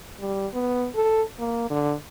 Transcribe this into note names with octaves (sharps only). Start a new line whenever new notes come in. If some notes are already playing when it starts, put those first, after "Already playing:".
G3
B3
A4
A#3
D3